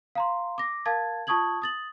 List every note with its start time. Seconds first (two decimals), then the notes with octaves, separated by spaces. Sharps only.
0.15 F5 A#5 C6
0.58 D6 A#6
0.85 A#4 F5 A5 G#6 A6
1.27 F4 A5 C#6 D#6 G#6 F#7
1.62 D#6 A6 F#7